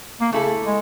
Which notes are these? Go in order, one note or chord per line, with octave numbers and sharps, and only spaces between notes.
A#3
C#3 A3 E4 A4
G#3